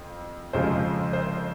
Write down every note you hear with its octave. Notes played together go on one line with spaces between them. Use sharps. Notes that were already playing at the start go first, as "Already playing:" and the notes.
Already playing: F2
F2 C#3 F3 G#3 C5
C5